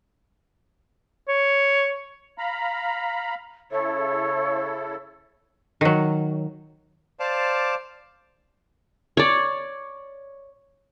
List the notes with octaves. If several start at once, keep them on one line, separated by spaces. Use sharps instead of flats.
C#5
F5 A#5 B5
C#3 E4 A4 C#5
D#3 F#3
C5 D5 F5 A5 D6
C#5 D5